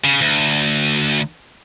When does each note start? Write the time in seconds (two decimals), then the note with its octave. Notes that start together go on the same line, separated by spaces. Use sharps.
0.04 C#3
0.21 D2